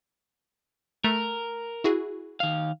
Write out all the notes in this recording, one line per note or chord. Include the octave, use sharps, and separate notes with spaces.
A3 A#4
E4 F#4 G#4
D#3 F5